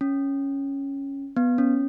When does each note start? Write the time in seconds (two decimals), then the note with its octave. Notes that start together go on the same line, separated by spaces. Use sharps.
0.01 C#4
1.37 B3
1.58 C#4